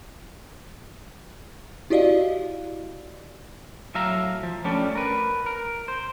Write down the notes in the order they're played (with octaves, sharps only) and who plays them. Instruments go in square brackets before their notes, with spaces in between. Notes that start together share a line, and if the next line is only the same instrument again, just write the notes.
[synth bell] E4 F#4 G4 D5 D#5 F5
[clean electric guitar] A2 F#3 E5 F5 A#5
F3
G3 A3 C#4 D4
A#4 B4
A#4
C5